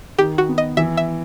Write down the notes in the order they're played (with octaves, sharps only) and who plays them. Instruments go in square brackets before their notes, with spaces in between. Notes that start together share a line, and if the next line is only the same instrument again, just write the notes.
[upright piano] D#3 [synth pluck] G4
[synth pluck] F#4
[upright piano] B3
[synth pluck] D#5
[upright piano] E3 [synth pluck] E5
[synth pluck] E5